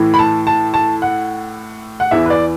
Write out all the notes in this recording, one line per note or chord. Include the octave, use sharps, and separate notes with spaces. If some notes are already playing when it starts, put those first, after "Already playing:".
Already playing: A2 E3
B5
A5
A5
A5
F#5
F#5
E2 E3 E5
B4
D5